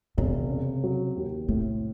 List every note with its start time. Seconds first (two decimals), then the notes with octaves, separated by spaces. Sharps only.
0.17 E1 C3
0.50 C#3
0.84 F#3
1.16 D#2
1.48 A2 C3